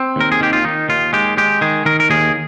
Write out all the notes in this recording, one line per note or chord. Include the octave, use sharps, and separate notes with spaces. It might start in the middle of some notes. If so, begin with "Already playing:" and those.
Already playing: C4
D#2 A#4
G#4
D#3 G4
F4
D#3 D#4
D#2 F4
G#3 G4
G#3 G4
D#3 G#4
D#3 A#4
A#4
D#2 G#4